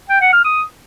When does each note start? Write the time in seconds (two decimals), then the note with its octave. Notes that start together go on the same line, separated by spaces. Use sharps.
0.09 G5
0.21 F#5
0.33 F6
0.44 D#6